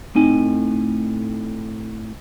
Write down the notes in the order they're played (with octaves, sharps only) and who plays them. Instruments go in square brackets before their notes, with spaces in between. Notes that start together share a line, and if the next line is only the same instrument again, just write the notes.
[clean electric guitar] A2 C4 G#5 [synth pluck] A3 D#4